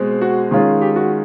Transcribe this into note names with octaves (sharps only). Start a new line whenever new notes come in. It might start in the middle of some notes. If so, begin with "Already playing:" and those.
Already playing: B2 G#3 C4
F#4
D#3 G#3 C#4 F4
G4
F#4